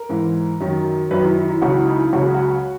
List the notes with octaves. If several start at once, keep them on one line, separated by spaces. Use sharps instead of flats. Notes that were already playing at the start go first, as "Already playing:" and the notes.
Already playing: A#4
G#2 E3
F#2 D#3 F#3
F#2 D#3 F#3 B4
E4
E4
E4
C#2 C#3 F#3 F#4
E4
D#4
E4
C#2 C#3 F#3 F#4
G#4
F#4